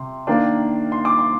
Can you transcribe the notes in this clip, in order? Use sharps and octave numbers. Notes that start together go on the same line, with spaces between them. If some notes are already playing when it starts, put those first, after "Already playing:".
Already playing: C3 C6
D#3 A#3 D4
C6
D6
C6